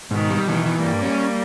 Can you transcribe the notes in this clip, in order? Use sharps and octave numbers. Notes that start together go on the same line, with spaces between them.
G#2 B2 D#3
G3
B2 D#3 E3
E3
G2 G3 A#3
C#4